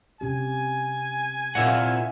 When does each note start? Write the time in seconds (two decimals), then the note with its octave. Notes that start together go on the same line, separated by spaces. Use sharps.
0.21 C3 C#4 G4 G#5
1.55 A#2 F#3 C4 E4 F#5